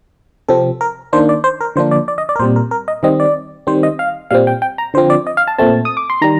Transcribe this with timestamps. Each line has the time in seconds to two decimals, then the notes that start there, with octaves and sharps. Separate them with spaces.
0.48 C3 F3 C4 A4
0.81 A#4
1.13 D#3 A#3 D4 C5
1.29 D5
1.44 C5
1.61 A#4
1.76 D3 F3 A#3 D4 C5
1.91 D5
2.08 D5
2.18 D#5
2.29 D5
2.36 A#4
2.39 A#2 G3 C4 C5
2.56 A#4
2.71 A#4
2.88 D#5
3.03 D#3 G3 C4 D#5
3.20 D5
3.67 D#3 G3 C4 C5
3.83 D#5
3.99 F5
4.31 A#2 G3 C4 F5
4.47 G5
4.62 G5
4.78 A#5
4.94 D3 F3 C4 C5
5.10 D5
5.27 D#5
5.37 F5
5.48 A5
5.59 A#2 A3 C4 A5
5.85 D#6
5.97 D6
6.10 C6
6.21 D#3 G3 A#5